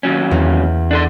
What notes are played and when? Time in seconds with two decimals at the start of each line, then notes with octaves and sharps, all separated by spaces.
0.03 D#2 F#3 C#4
0.31 E2
0.91 D4 A4 C6